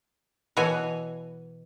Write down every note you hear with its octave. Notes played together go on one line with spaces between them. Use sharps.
B2 E3 F#4 C#5 G#5